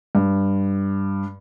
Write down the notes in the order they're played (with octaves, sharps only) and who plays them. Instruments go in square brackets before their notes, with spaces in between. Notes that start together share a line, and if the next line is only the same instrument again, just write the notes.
[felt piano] G2